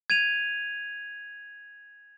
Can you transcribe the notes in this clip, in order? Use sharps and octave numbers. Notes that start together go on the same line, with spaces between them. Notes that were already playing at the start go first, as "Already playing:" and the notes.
G#6 D#7 F7